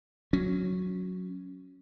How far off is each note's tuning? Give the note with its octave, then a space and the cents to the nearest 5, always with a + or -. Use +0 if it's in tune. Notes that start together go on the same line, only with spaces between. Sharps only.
F#3 -10 C#4 +0